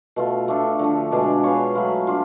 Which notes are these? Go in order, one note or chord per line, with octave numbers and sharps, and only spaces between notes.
B2 A3 F4
A3 D4 F4 A4
D3 F3 A3
B2 G#3 D4 G#4
B3 F4 G#4 C#5
F#3 A3 F4 B4
D4 F4